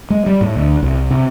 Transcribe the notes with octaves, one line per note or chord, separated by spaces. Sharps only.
G#3
G3
A2
D2
C2
C3